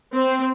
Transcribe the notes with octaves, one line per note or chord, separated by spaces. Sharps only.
C4